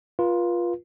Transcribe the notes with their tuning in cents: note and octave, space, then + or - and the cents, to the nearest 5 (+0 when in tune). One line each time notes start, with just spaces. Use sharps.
F4 +0 B4 -35